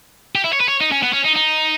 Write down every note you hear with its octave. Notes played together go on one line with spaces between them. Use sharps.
G4
E4
C#5
B4
C#5
D#4
C#4
B3
C#4
D#4
D#4